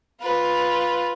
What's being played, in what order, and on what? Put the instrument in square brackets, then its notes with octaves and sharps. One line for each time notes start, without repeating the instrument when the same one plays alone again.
[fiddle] F4 B4